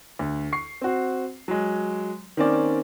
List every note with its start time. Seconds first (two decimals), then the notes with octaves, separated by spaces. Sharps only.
0.19 D2
0.53 C#6 C7
0.81 C4 F#4
1.48 F#3 G#3
2.37 D#3 A#3 C4 C#4 D5